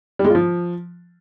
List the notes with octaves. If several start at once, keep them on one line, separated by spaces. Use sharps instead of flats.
G3
G#3
F4
F3